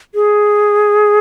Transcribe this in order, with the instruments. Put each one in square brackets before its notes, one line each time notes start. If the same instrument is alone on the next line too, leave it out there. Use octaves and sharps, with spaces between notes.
[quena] G#4